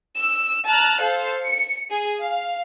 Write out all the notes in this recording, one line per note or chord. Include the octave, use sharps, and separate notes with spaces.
E6
A5 A#5 F6 F#6
A4 C5 F5
C#7
G#4
F5